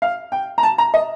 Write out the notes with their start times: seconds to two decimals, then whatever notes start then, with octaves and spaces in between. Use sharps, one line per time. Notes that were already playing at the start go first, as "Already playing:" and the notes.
0.02 F5
0.32 G5
0.58 A#5
0.63 A5
0.78 A#5
0.94 D#5